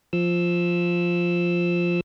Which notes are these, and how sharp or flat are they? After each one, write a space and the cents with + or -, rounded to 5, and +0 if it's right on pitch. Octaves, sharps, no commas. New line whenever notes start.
F3 +0 E6 +0